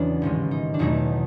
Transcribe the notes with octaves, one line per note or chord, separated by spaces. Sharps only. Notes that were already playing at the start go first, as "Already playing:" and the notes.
Already playing: E1 E2 C#3 F#3 D4
A1 G#2 D#3 G#3
D#4
D4
E2 B2 F#3 A3 D#4